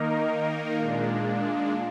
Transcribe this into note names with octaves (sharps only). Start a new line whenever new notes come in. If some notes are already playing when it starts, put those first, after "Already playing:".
Already playing: D#3 A#3 D#4 A#4 D#5
A#2 G#3 D4 F5